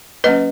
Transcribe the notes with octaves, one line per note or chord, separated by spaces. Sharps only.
F#3 A#3 C#4 B4 D#5